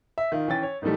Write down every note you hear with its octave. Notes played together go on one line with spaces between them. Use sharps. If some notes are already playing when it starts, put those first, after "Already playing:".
E5
D#3 F4
E3 C#4 G5 A6
C#5
G#2 D#3 E3 G3 A3